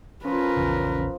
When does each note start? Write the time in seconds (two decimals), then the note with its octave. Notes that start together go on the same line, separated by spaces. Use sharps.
0.24 F3 C#4 A#4 B4
0.57 A#1 E2 C#3